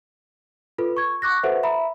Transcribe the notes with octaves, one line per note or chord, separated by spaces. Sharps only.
F4 A4 B4
C#6 G#6
C#6 D6 F#6 A#6
F#4 A4 B4 C5 E5 F#5
E5 A#5 B5